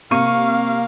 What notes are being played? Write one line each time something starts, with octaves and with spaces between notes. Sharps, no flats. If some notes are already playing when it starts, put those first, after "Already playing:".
C3 A#3 F5 C#6 D#7